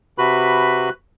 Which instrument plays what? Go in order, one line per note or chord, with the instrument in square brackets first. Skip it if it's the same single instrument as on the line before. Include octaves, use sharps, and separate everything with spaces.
[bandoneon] C3 F#4 B4 B5